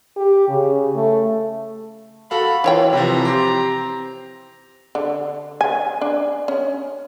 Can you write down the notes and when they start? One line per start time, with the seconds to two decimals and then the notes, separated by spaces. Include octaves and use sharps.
0.17 G4
0.48 C#3
0.95 A3
2.31 F#4 A4 F5 B5
2.64 E3 E4 F4 C#5 G5
2.93 C3 E3 F3 C4 A#5
3.25 G4 C6
4.95 D3
5.61 G#5
6.01 D4
6.48 C#4